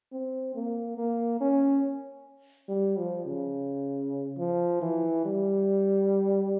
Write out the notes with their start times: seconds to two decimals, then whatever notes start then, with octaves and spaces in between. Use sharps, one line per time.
0.13 C4
0.55 A#3
0.98 A#3
1.41 C#4
2.69 G3
2.97 F3
3.26 C#3
4.38 F3
4.82 E3
5.25 G3